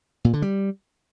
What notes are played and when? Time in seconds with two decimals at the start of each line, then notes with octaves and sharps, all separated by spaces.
0.25 A#2
0.33 D3
0.42 G3